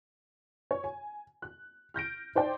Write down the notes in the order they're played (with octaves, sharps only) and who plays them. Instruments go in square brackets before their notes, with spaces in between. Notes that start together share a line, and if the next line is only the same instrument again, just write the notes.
[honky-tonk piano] C#5
G#5
F#6
F6 G6 A#6 D7
D#4 C5 D5 G5